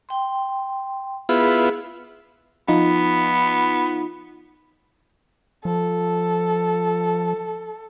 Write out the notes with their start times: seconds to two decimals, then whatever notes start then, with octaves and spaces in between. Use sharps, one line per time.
0.09 G5 C6
1.29 B3 E4 F4 G#4
2.68 F3 B3 D#4 F4
5.65 F3 A4